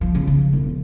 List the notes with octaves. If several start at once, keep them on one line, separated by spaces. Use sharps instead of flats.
F3
C#3
F3
E1